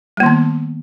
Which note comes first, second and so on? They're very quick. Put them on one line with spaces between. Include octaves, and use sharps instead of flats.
G3 A#3 D#3 B3